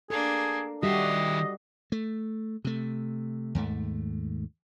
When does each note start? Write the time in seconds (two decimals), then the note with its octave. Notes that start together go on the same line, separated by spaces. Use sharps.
0.10 A#3 D4 G#4 A4
0.83 D#3 G3 F#4 G4 D#5 E5 C6
1.92 A3
2.65 C3 A3
3.55 D#2 G#2 A3